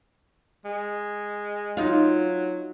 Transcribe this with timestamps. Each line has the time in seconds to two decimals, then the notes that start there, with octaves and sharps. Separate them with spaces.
0.65 G#3
1.77 F#3 D#4 F4